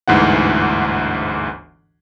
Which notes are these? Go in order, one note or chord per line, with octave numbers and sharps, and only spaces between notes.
G1 D2 G#2 E3 F#5